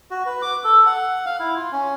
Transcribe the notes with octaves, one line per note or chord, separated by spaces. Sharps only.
F#4
B4
D6
A4
F#5
F5
E4
F4
C#4